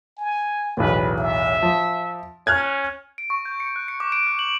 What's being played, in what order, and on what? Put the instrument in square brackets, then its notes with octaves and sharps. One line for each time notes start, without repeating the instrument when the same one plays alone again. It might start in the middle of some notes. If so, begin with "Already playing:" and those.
[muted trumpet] G#5
[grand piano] B1 E2 A2 [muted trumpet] B4
[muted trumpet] E5
[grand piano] F3
[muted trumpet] C#4 [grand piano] F6 F#6 G#6
[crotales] D7
C#6
G6
C#7
F#6
C#7
D6
D7
F#6
F#7